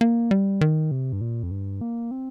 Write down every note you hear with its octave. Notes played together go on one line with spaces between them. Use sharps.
A#3
G3
D#3
C3
G2
A#2
F2
G2
A#3
C4